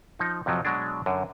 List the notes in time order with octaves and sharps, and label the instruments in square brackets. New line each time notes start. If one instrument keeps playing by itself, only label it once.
[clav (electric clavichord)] F3 D#4
F2 C3 F3 F#3
B2 F#3 G#3 D4
F#2 D3